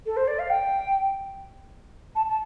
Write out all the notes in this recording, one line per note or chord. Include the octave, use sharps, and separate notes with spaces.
A4
C5
D5
F5
G5
A5
A5